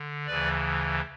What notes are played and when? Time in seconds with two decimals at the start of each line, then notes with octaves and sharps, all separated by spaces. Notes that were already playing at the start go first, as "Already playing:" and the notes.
Already playing: D3
0.26 D2 C#3 E3 B4 D5